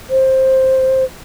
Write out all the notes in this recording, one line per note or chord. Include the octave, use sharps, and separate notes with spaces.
C5